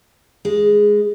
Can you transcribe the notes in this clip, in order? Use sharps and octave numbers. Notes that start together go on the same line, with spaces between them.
G#3